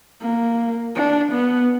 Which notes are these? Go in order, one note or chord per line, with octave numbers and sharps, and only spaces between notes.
A#3
D4
B3